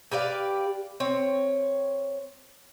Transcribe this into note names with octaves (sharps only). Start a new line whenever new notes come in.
G4 B4 D5 F5
C4 C#5